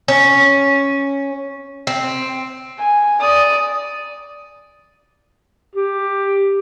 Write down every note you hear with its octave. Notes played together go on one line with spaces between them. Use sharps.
C#4
C4
G#5
D5 D#6
G4